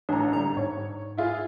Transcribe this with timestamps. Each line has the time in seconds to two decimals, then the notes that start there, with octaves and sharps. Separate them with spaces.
0.09 A1 D4 A#5
0.33 D3 G3 A#5
0.57 G#2 C#5
1.17 E4 F4 G#4